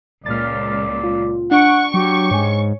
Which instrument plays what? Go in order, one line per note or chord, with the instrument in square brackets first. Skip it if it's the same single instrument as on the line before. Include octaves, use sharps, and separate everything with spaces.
[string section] C#2 A#2 [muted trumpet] D5 [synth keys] F6 A6
[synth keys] F4
[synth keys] D4 D7 [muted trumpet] F#5 [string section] C#6
[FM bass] F#3 [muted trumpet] G4
[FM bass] G#2 [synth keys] C#5 G#5